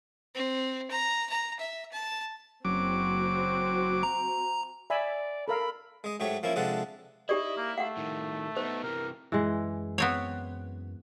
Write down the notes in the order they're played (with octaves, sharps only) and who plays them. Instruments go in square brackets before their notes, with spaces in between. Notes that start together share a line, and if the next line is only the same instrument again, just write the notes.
[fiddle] C4
A#5
A#5
E5
A5
[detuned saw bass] F#1 [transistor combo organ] F#3 D6 [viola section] C4 F#4
[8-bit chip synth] A#5
[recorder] D5 [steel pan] E5 G#5 B5
[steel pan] A4 A#4 F5 [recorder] B5
[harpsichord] G#3 D#5
G#2 F#3 A3 G4 C#5
F3 A#3 C#4 E4
C3 F3 G#3 D4 A4 F#5
[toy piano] D#4 G4 D5 [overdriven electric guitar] E4 [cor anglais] D#5
[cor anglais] A#3
[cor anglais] A3 [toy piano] F5 F#5
[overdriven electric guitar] A2 D#3
[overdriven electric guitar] B3 D#4 [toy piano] C5
[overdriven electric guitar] C3 E3 [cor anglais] A#4
[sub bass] F#2 [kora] E3 G#3
[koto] B3 C4 C#5